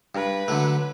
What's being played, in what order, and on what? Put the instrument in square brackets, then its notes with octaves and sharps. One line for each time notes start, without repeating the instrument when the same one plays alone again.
[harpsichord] G2 [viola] B4
[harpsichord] D3 F#3 A3